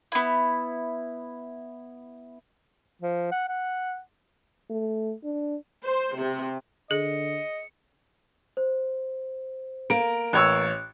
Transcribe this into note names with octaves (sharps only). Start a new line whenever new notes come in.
B3 E4
F3
F#5
F#5
A3
D4
C5
C3
D3 G#4 D#5 C#7
C5
A#3 A#4 D7
A1 C#5 E6 F#6